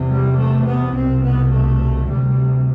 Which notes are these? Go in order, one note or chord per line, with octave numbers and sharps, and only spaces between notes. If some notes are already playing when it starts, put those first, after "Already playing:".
Already playing: E2 C3
G3
A3
B3
C2 B2 C4
B3
A3
D2 C3 G3